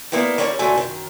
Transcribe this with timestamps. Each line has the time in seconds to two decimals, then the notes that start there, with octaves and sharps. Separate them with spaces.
0.12 G3 A#3 B3 E4 G4
0.38 G3 A#3 C#4 E4 G#4 C#5
0.59 D2 F#3 G3 A3 G#5
0.76 F#2 D#3